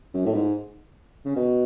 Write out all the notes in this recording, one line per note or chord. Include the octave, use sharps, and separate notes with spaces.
F#2
A2
G#2
C#3
B2